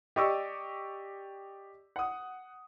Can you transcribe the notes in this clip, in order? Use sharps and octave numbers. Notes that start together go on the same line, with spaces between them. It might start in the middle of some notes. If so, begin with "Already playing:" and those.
G4 D5 D#5 C#6 D6 E6
F#5 D#6